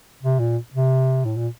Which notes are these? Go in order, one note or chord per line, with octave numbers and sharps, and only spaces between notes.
C3
A#2
C3
A2
A#2